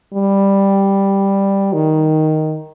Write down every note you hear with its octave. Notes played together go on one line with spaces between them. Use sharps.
G3
D#3